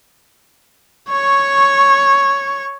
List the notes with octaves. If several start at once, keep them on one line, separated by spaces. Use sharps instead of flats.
C#5 C#6